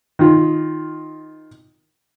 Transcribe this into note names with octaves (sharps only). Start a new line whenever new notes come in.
D#3 F4